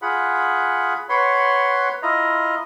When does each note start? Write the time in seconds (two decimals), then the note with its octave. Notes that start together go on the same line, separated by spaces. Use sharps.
0.02 F4 G#4 F#5 B5
1.09 B4 C#5 F#5 B5 C6
2.03 E4 F4 D#5 A#5